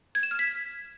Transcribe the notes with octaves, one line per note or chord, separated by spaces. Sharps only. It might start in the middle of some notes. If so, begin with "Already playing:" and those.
G#6
E7
F6
B6